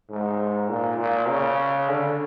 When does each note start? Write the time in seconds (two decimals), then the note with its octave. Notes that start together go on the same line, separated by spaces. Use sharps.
0.10 G#2
0.69 A#2
0.99 A#2
1.29 C#3
1.88 D3